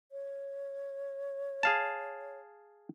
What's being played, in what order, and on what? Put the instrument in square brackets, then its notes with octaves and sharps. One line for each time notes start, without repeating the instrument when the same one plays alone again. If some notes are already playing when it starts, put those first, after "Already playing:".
[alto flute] C#5
[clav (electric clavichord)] G#4 F5 A5